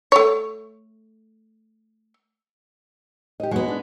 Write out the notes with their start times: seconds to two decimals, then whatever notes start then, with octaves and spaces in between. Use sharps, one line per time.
0.12 A3 C#5
3.40 G4 D#5
3.51 D#2 G#3 B3 F#4
3.68 D4